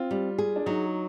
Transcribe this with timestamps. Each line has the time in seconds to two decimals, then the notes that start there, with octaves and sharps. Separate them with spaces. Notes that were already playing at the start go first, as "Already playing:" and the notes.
Already playing: C4 F4
0.11 G3
0.38 G#4
0.56 D4
0.66 F#3 D#4